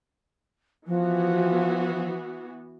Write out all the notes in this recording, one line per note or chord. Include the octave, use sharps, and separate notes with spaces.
E3 F3 B3 F#4